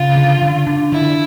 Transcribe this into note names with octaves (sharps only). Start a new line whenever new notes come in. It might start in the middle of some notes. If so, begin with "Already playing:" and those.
Already playing: C#3 F4
D3
D3
D4
D3 E4